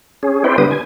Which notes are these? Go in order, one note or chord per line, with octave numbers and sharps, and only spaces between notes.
C#4 G#4
C4 E4 B4 C5 D5 G5
D3 G3 B3 B4 D#6
G#5